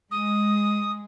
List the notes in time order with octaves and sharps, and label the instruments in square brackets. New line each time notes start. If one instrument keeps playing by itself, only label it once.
[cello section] G#3 [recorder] D#6